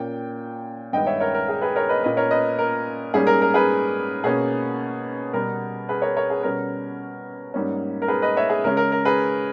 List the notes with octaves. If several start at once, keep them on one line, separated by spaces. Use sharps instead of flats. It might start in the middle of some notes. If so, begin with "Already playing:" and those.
Already playing: A#2 A#3 C#4 G5
G2 D#3 G#3 B3 D#5 G5
C#5 E5
A#4 C#5
A#4
G#4
G#4 B4
A#4 C#5
B4 D#5
A#2 A#3 C#4 B4 D#5
A#4 C#5
B4 D#5
A#4
G#2 G3 A#3 C#4 G#4
A#4
A#4
G#4 B4
B2 A#3 C#4 G#4
B2 G3 B3 A#4
G#4 B4
A#4 C#5
A#4 C#5
G#4
B2 G3 C#4 A#4
G#2 G3 A#3 C#4
A#4
G#4 B4
B4 D#5
C#5 E5
G#4
C#3 G#3 C#4 A#4
A#4
A#4
G#4 B4